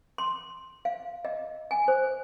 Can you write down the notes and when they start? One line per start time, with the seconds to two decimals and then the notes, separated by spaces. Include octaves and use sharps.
0.18 C6
0.85 F5
1.25 D#5
1.71 G#5
1.88 C5